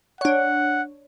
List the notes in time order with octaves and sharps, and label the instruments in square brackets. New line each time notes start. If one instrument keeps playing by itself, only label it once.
[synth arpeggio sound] D4 C#5 [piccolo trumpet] F#5